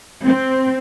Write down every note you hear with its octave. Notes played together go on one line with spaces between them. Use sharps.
C4